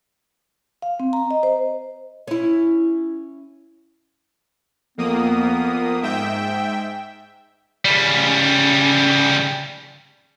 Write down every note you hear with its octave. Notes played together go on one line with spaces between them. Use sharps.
F5
C4
A#5
D#5
C5
C#4 E4
F2 A#3 B3 D#6
G#2 E5 G5
C#3 G3